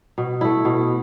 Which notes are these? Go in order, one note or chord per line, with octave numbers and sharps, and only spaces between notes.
B2
A3 E4
B2